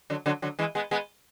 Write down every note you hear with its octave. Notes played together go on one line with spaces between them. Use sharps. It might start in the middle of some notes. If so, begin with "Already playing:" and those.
D3 F#3
D3 F#3
D3 F#3
E3 G#3
G#3 B3
G#3 B3